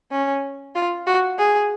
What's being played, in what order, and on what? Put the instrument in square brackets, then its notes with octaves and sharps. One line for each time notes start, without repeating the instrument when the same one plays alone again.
[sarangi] C#4
F4
F#4
G#4